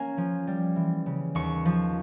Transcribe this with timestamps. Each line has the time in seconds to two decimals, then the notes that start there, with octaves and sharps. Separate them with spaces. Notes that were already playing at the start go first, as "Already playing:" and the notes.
Already playing: A#3 C#4 G#5
0.17 F3
0.47 G3
0.76 E3
1.06 C#3
1.35 D#2 C#6
1.65 F3